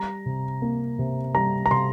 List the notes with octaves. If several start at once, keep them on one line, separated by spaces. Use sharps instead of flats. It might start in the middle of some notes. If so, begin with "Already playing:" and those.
Already playing: G3 A#5
C3
A#3
C3
G3 A#5
A#5
C3 C6